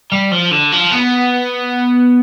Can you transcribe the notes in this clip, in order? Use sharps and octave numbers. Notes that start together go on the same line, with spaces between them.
G3
F3
D3
F3
B3